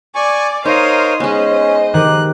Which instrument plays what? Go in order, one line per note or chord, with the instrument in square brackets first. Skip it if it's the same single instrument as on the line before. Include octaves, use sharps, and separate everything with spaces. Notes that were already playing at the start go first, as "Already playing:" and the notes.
[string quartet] D5 D6 [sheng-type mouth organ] G#5 C#6
[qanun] D#4 [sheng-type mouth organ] A#4 C5 C#5 [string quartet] F5 C6 D#6
[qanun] G#3 B3 [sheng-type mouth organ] C#4 [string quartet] C5 D#5
[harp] D#3 G4 [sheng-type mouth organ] F#6